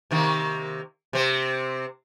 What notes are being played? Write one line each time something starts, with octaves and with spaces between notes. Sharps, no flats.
C3 D#3 A#3
C3 C4